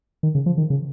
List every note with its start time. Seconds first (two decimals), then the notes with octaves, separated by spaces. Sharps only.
0.23 D#3
0.35 C#3
0.46 F3
0.58 D#3
0.70 C#3